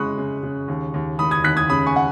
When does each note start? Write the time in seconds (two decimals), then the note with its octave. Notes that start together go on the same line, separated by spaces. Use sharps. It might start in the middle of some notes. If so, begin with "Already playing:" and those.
Already playing: C#3 G#3 B5 C#6 D#6 F#6
0.18 C#3
0.43 C#3
0.68 D#2
0.94 D#2
1.19 D#3 B5 D#6
1.31 D#6 G#6
1.44 D#2 F#6 B6
1.57 D#6 G#6
1.69 C#3 B5 D#6
1.86 G#5 C#6
1.96 F#5